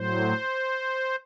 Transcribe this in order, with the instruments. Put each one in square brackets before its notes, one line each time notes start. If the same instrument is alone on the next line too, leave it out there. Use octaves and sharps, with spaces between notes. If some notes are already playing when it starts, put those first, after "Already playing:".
Already playing: [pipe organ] A2 F#3 C5